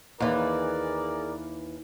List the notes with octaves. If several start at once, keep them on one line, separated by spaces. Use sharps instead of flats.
D#2 E3 G#4 A#4 D5